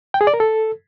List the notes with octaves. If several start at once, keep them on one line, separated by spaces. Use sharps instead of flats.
G5
G#4
D5
A#4
A4